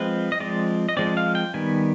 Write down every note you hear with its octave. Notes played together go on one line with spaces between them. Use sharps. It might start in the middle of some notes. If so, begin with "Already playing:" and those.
Already playing: F3 G#3 C4 B4
D#5
F3 G#3 C4 D5
D#5
F3 G#3 C4 D5
F5
G5
D#3 G3 B3 G#5